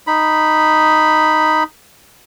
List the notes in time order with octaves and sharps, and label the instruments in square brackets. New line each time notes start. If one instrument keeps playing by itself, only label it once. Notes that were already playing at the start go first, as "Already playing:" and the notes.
[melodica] D#4 B5